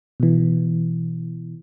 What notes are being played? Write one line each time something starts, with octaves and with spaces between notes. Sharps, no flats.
B2 E3